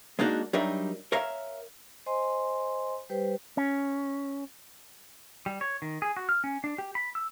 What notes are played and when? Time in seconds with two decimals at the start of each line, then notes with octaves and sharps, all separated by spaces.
0.19 G#3 A#3 D4 D#4 F#4
0.53 F#3 G3 D4 D#4 A#4 E5
1.12 A#4 C#5 E5 F5 A#5
2.06 C5 D#5 G#5 C6
3.09 G3 G4 B4 C5 G5
3.57 C#4
5.46 G3
5.61 C#5
5.82 D#3
6.02 G#4
6.17 F#4
6.29 F6
6.44 C#4
6.64 D4
6.78 G4
6.95 B5
7.15 E6